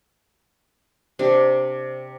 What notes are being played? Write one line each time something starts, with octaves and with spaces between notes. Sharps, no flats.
C3 D4